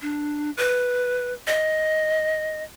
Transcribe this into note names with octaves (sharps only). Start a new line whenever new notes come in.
D4
B4
D#5